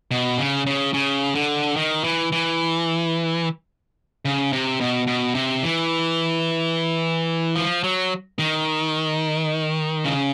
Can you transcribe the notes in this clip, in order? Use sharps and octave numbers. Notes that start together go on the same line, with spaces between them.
B2
C#3
C#3
C#3
D3
D#3
E3
E3
C#3
C3
B2
B2
C3
E3
F3
F#3
D#3
C#3